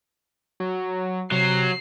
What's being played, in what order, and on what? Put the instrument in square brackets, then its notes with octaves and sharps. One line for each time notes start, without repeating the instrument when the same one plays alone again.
[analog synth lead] F#3
[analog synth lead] C3 [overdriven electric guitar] F#3 [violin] C7